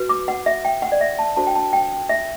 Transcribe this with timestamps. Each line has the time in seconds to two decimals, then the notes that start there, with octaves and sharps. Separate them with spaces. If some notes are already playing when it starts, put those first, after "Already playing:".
Already playing: F#4 B4
0.09 D6
0.28 F#5
0.46 E5
0.65 G5
0.82 F#5
0.92 D5
1.01 E5
1.19 A5
1.36 D4 F#4 A4 C5 A5
1.47 G5
1.55 A5
1.73 G5
2.09 E5